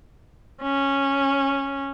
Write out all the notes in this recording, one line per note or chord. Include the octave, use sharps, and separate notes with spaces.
C#4